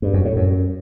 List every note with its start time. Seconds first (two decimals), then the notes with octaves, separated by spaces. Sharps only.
0.02 G2
0.14 F#2
0.25 A2
0.36 F#2